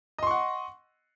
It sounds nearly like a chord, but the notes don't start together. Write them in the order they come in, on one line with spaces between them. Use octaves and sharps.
D#5 C6 C#6 F#5